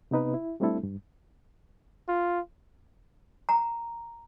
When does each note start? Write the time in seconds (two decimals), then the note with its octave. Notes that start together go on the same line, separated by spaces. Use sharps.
0.11 C3 B3 D#4 B4
0.34 E4
0.60 G3 A3 C4 D4 E4 A4
0.83 G2
2.08 F4
3.49 A#5